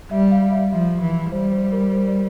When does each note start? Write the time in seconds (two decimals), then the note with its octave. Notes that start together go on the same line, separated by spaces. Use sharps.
0.11 G3 E5
0.31 F5
0.51 E5
0.72 F3 E5
1.02 E3
1.32 G3 C5
1.52 C5
1.72 A#4
1.93 C5
2.08 D5